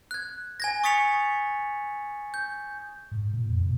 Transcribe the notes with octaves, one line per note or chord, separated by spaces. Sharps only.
F#6 G#6
G#5 G#6 A#6
C#6 D#6 A6 B6 C#7 F7
G6
G#2
A#2
F2
B2